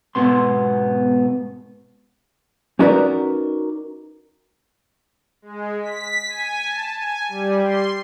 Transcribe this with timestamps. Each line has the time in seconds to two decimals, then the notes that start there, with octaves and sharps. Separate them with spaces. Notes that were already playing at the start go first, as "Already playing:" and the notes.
0.15 G#2 B2 B3 C6
2.79 C#4 D#4 F#4 A#4 B4 D5
5.42 G#3
5.82 B6
6.28 G#5
6.64 A5
6.98 G#5
7.28 G3
7.62 C6